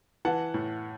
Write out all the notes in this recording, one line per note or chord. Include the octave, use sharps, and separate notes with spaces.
E3 F#5 A5
A2